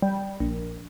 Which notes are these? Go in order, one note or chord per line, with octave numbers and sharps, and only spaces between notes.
G3
A#1